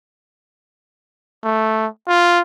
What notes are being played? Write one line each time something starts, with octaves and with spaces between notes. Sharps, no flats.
A3
F4